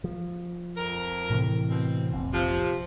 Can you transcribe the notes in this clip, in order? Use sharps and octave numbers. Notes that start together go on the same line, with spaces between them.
F3
F2 A#4
A2 C3 E3
B2 C4
F1 A#1 C4
C3 F3